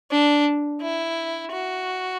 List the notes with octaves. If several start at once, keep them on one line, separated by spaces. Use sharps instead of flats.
D4
E4
F#4